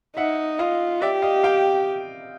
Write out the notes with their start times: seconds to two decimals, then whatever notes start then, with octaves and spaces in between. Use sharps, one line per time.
0.17 D#4 E5 F#5
0.59 F4 D#5 F5
1.02 G4 D5 E5
1.22 D#5 F5
1.43 F5 G5